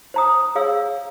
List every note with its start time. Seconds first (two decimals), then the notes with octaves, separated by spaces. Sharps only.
0.14 C5 A#5 D#6
0.55 G#4 C#5 F5 E6